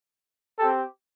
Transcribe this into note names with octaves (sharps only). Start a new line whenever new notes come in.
C4 G4 A4